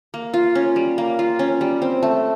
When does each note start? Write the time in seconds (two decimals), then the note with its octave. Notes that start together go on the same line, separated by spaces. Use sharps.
0.14 A#3
0.34 F4
0.55 C#4
0.76 G3
0.98 A#3
1.19 F4
1.39 C#4
1.61 G3
1.82 C4
2.03 A3